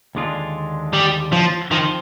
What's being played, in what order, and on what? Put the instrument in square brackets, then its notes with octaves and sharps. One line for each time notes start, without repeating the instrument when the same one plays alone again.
[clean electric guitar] D#2 D3 G#3 D4 F4
[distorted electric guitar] G3
F3
[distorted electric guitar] D#3 [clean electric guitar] F3 C4 F4